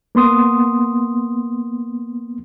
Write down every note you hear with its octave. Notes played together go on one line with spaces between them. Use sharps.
A#3 B3 C6 D#6